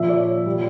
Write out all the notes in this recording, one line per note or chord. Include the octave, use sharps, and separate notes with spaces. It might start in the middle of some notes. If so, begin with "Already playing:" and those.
Already playing: A#2 F3 E5
D5
C#5
A#2 G3